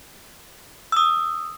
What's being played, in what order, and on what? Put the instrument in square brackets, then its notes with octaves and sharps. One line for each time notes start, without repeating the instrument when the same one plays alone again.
[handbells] D#6 E6